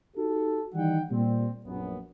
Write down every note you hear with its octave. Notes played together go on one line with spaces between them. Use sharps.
D#4 F#4 G4 A4
D#3 E3 G3 D#4 F#5 G5
A#2 G3 C4
A#1 F#2 B3